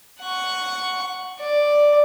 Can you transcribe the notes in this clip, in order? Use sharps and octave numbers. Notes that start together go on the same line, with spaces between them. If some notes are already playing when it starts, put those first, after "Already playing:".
F#5 C#6
D5